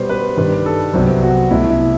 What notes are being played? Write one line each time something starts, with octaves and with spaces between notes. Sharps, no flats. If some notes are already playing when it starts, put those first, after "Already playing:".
Already playing: B2 G3 B3 C5
B4
G2 D#3 G3 B4
A4
C2 C3 F#3 B3 C5
F#4
C2 B2 A3 E4
E4